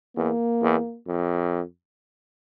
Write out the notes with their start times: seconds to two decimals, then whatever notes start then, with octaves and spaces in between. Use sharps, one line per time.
0.16 E2 A#3
0.62 E2
1.07 F2